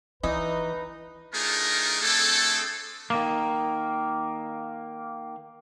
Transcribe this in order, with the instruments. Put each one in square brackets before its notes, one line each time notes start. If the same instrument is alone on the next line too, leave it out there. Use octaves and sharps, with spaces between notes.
[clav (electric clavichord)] E3 [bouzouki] D#4 [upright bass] E4 [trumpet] B4
[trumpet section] A3 D4 D#4 F4 G#4 A#4
A3 C4 D4 G#4 A4
[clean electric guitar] D#3 A#3